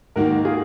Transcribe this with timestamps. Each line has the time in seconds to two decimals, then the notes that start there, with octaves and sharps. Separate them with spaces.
0.16 G#2 D#3 A#3 F#4 A#4
0.45 F4 G#4